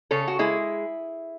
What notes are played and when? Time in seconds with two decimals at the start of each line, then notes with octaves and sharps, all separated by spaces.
0.11 C#3 A4 C#5
0.28 F#4
0.39 G#3 E4 G#4